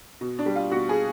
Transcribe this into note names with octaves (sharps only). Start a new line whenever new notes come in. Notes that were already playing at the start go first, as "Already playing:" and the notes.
B2
D4
G3
F4
B2 F#4
G#4